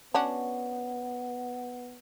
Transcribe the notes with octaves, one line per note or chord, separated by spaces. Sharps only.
B3 C#4 D4 F#4